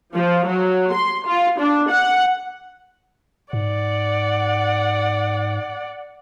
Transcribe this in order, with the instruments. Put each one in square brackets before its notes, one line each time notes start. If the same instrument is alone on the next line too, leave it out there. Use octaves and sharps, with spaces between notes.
[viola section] F3
F#3
C6
F4
D4
F#5
[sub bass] G#2 [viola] D5 F#5